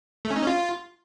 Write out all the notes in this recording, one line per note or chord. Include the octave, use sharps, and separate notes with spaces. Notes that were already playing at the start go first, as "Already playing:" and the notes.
A3
C#4
D#4
C#4
F4